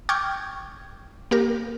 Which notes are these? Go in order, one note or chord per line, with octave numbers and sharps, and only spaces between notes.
G5 C#6 D6 F6 G6 G#6
A#3 G4 A#4